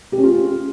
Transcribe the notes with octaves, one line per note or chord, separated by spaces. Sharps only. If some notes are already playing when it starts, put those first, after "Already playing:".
G4
C#4
F4